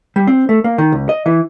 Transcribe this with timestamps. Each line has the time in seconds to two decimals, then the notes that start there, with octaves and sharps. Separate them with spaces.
0.16 G3
0.27 C4
0.49 A3
0.64 A#3
0.78 D#3
0.92 C#2
1.09 D#5
1.26 E3